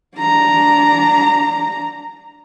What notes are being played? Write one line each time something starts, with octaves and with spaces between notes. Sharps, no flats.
D4 A#5